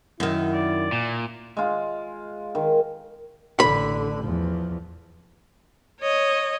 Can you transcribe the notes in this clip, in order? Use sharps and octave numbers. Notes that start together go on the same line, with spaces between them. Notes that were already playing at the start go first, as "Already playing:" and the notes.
F#2 D#3 E4
D5
A#2
G#3 F4
D#3
A1 D3 B5
E2 F3
C#5 D#5